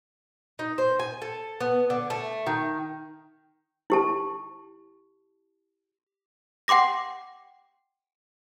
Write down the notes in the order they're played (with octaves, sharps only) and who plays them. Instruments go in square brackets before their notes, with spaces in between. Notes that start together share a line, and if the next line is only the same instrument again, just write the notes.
[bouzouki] D#4
C5
G#5
A4
B3
D3
A3
D#3
[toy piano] E4 G4 A5
[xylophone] F#5 G5 C6 D6 A#6